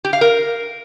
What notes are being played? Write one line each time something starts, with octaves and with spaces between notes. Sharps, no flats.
G4
F5
A#4